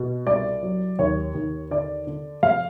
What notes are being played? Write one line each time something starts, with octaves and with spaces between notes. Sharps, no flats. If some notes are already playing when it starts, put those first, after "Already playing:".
Already playing: B2
C2 D5
F#3
D#2 C#5
D#2
D3 D5
D3
F2 F5